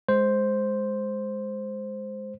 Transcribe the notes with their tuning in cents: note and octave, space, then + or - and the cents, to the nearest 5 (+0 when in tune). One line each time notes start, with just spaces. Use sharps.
G#3 +0 C5 +0